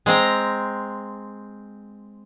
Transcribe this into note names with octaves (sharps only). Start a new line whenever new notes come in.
G#3 C4 A#5